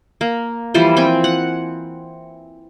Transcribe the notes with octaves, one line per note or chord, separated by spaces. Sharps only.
A#3
E3 F3 G3 C5
C4 G5 G#5
F#5